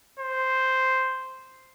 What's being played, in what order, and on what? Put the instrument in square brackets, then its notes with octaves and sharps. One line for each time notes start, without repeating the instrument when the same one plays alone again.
[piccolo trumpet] C5